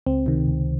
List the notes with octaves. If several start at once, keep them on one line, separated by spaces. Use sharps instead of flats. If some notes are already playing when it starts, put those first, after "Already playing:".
C#2 C4
C3 D#3
C#2